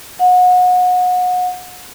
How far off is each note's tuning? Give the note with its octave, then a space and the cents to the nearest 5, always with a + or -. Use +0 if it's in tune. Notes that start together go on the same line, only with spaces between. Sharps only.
F#5 -30